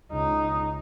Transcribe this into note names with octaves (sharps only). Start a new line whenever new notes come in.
C#2 D#4